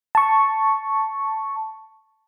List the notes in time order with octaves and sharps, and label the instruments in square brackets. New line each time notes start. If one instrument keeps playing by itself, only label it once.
[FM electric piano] A5 C#6